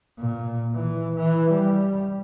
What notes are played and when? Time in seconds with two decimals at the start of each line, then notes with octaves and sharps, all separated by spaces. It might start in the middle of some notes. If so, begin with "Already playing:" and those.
0.19 A#2
0.74 E3
1.16 E3
1.50 G3